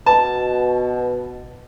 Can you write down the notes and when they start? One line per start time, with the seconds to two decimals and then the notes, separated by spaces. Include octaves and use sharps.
0.06 B2 A5